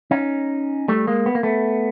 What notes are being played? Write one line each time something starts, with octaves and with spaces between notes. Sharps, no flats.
C#4 D#4
G3 A3
G#3 A#3
B3
A#3
A3 B3